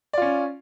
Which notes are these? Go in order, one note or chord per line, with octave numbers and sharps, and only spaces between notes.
C#4 F4 D5